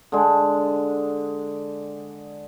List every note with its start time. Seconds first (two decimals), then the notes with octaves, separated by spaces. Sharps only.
0.12 D3 G#3